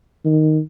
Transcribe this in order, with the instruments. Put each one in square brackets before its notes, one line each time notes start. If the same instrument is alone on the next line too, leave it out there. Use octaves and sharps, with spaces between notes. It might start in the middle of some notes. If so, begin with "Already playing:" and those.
[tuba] D#3